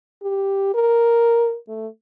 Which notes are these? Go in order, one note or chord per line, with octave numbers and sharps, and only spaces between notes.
G4
A#4
A3